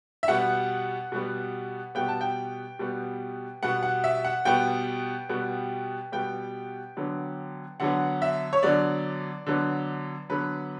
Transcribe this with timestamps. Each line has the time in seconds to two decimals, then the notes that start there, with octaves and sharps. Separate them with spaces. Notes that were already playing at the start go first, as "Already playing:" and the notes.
0.23 E5
0.28 B2 G3 B3 F#5
1.12 B2 G3 B3
1.95 B2 G3 B3 G5
2.08 A5
2.21 G5
2.79 B2 G3 B3
3.63 B2 G3 B3 F#5
3.83 F#5
4.04 E5
4.24 F#5
4.45 B2 G3 B3 G5
5.29 B2 G3 B3
6.12 B2 G3 B3 G5
6.97 D3 F#3 B3
7.80 D3 F#3 B3 F#5
8.22 E5
8.53 C#5
8.63 D3 F#3 B3 D5
9.47 D3 F#3 B3
10.29 D3 F#3 B3 B4